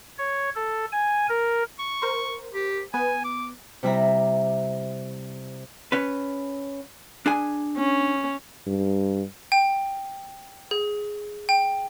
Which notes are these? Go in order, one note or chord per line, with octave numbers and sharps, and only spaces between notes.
C#5
A4
G#5
A#4
C#6
A#4 C5
G4
B3 B4 G#5
D6
C3 G3 E4 E5 A#5
C#4 B4
D4 G#4 G#5
C#4
G2
G5
G#4
G5